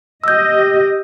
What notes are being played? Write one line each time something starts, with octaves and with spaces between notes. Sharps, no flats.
G4 D#5 E6 G6